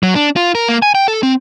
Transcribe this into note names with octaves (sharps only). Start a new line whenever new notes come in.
F#3
D4
F4
A#4
A#3
G#5
G5
A4
C4